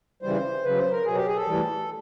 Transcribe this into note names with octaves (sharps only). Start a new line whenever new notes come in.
C#3 E3 G3 C5
C#3 F#3 B4
C5
A#4
B2 F#3 G#4
G4
G#4
A4
A2 E3 G3